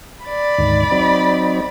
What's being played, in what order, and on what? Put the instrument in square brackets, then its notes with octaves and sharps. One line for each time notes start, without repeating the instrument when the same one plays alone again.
[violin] D5 B5
[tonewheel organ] D2 G#2 D#3
F#3 C4 D#4